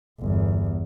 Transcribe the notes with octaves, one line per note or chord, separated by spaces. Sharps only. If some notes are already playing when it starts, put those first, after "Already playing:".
G1 E2